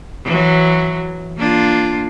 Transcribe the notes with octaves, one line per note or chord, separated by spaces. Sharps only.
E3 F#3
A#3 D4 F4